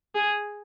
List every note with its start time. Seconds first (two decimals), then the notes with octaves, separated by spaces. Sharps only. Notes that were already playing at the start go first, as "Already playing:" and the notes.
0.15 G#4